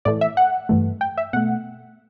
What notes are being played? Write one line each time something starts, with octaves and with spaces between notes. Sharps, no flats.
A2 E3 A3 D5
E5
F#5
G2 E3 A3
G5
E5
B2 A3 F#5